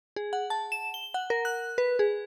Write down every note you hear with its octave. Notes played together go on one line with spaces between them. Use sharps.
G#4
F#5
A5
E7
G7
F#5
A#4
F#6
B4
G#4